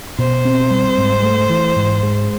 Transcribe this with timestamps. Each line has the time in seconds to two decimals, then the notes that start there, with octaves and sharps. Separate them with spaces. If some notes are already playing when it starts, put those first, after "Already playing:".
0.18 B2 C5
0.45 C4
0.70 G3
0.98 G#2
1.23 A3
1.50 E3
1.76 G#2
2.03 G#3